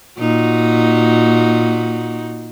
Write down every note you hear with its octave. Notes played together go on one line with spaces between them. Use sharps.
A#2 D#4 F#4